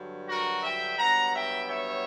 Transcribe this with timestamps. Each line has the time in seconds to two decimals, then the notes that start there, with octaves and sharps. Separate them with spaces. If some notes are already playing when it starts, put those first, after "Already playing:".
Already playing: G2 D3 F#3
0.28 F#4 A#4
0.64 E5 G5
0.98 G2 F#3 B3 F#5 A#5
1.34 E5 G5
1.69 C#5 E5